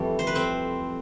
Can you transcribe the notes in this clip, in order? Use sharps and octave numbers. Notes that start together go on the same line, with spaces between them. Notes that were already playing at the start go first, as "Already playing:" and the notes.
Already playing: F2 E3 G3 A3 A4
C5
B4
C4 C5